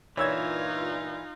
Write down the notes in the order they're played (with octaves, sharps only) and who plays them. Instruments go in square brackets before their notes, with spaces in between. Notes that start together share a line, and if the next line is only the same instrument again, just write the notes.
[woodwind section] G2 A#2 [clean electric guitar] E3 [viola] D#4 F4 [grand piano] C#5 E6 G#6